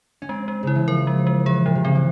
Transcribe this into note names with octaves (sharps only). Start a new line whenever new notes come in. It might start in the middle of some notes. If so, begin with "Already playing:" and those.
C#4
G#3 C4
G#3
C#3 E4
E3
F3 A#4
G#3
G#3
E3 G#4
A#2 F3
C3
C#3 C4
E3